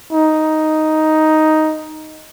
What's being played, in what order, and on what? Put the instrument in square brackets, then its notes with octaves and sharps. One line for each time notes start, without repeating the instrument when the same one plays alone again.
[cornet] D#4